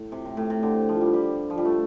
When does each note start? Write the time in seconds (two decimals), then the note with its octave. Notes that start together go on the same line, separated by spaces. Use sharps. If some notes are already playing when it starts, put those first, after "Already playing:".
Already playing: A2
0.12 C3
0.25 A2
0.37 A2
0.50 C3
0.63 D3
0.89 F3
1.01 G3
1.14 G3
1.50 F3
1.58 G3
1.65 A3